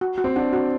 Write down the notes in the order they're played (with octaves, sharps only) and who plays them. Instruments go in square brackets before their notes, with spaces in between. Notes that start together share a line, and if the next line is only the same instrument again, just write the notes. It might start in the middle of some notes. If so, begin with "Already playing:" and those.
[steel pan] F#4
F#4
[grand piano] C4
[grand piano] D4 [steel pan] F#5
[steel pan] F#4